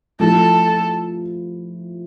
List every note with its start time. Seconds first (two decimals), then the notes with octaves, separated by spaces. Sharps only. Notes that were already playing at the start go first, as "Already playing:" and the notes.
0.20 F3 A3 E4 A4